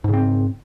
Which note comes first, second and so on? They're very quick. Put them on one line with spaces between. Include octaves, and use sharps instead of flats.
G#2 C#3 C4